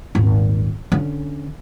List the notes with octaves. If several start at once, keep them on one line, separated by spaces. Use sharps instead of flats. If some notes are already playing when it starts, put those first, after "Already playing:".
D#1 G#1
D3 C#4